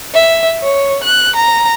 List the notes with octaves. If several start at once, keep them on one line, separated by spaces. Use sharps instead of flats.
E5
C#5
F#6
A#5